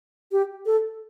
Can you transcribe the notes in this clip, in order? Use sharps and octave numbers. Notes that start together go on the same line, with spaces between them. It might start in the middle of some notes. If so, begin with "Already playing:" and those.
G4
A4